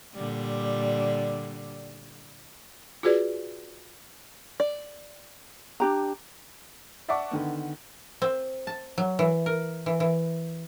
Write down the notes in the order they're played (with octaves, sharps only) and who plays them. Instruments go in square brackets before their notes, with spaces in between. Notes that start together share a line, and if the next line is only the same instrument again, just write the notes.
[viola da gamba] A#2 D3 G3
[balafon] F4 F#4 G#4 B4 D5
[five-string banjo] D5
[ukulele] D4 G4 A#5
[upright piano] D5 E5 F#5 A5 C#6 D6
D3 D#3 B3
[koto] C4
A5
F#3
E3
A#4
E3
E3